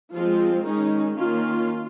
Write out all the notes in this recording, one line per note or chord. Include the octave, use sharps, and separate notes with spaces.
F3 G#3 C4 F4
D#3 G#3 C#4 D#4
D#3 A#3 C#4 F4